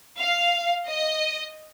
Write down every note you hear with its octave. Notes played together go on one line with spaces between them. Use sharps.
F5
D#5